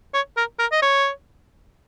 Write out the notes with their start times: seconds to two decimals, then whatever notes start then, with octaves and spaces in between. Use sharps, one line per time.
0.14 C#5
0.37 A#4
0.59 A#4
0.71 D#5
0.82 C#5